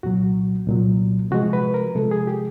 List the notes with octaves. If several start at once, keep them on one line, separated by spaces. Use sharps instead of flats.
C2 A#2 F#3 F#4
C2 A#2 F#3
C3 F3 G#3 F#4
B4
A#4
C3 F3 G#3 A4
G#4
G4